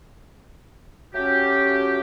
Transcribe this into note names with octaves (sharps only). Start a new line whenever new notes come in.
F#3 A3 C#4 F#4 G4